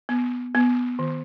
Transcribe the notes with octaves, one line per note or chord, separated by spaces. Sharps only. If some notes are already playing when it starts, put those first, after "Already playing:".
B3
B3
D#3